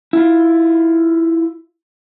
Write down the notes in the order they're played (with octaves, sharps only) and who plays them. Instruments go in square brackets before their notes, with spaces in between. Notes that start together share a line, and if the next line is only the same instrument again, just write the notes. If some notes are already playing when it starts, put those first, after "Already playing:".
[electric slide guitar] E4 F4